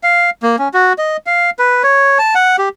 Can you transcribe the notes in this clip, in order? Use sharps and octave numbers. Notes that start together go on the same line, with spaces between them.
F5
A#3
C#4
F#4
D#5
F5
B4
C#5
A5
F#5
G4